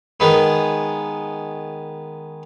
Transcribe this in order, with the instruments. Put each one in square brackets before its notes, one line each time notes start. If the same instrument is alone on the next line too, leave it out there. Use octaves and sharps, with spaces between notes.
[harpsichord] D#3 G#3 B3